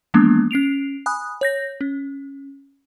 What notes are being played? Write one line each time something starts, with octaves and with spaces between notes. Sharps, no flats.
E3 F3 G#3 A#3 B3 D4
C#4 C7 D7 F7
G#5 B5 D#6 F#6
C#5 G6 A#6
C#4